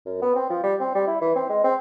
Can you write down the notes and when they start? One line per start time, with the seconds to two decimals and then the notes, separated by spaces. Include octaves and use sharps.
0.06 F#2
0.22 B3
0.35 C4
0.50 F3
0.63 G3
0.80 C4
0.95 G3
1.07 E4
1.22 E3
1.35 C4
1.49 G#3
1.64 C4